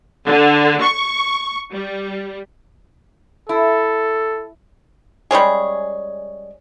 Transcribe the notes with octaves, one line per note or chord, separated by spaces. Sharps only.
D3
C#6
G3
E4 A4
G3 G#3 C#4 G#4